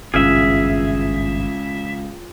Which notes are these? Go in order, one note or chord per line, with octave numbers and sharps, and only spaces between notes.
G#1 C#2 G2 B2 F4 G#4 E5 F6